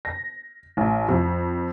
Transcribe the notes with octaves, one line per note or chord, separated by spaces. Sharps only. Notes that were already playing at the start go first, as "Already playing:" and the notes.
A#6
A1
F2